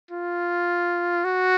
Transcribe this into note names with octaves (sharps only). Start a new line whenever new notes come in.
F4
F#4